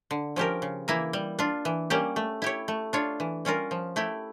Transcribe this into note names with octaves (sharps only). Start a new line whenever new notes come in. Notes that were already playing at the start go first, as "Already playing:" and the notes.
D3
F3 C#4 G4 A#4
C#3
E3 A#3 E4 A#4
G3
D4 F4
E3
G3 A#3 C#4 G4
A3
E4 G4 C#5
A3
D4 F4 C#5
E3
G3 C#4 F4 A#4
F3
A3 E4 G4